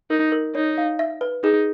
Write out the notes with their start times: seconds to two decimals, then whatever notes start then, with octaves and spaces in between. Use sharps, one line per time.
0.10 D#4 A#4
0.32 A#4
0.55 D#4 C#5
0.78 F5
0.99 E5
1.21 B4
1.43 D#4 G#4